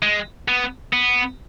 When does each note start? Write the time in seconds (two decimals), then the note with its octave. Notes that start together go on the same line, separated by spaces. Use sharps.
0.02 G#3
0.48 B3
0.93 B3